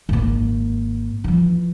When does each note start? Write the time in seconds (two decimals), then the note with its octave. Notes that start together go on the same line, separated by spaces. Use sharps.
0.09 G#1 A#3
1.24 E3 F3